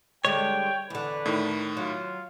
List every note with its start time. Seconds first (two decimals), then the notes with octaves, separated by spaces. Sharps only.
0.25 D3 G3 G#3 C#5 G5
0.90 E2 D3 B4
1.26 A2 D#3
1.77 F#3 F4